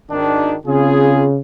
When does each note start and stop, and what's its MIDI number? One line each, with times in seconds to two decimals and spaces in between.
0.11 0.56 32
0.11 0.56 51
0.11 0.56 62
0.66 1.40 49
0.66 1.26 60
0.66 1.26 65
0.66 1.26 68